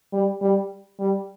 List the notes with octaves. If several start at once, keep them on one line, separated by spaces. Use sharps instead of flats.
G3
G3
G3